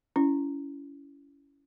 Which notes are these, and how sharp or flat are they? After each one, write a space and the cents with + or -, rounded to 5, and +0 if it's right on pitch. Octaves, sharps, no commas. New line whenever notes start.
C#4 +25 E4 +15